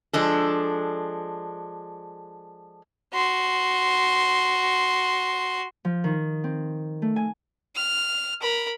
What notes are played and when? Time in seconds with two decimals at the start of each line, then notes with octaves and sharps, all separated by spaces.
0.13 F3 G#3 D4 A4
3.13 F#4 C6
5.85 F3
6.04 D#3
6.44 C4
7.02 A3
7.16 G#5
7.76 F6
8.41 A#4 B5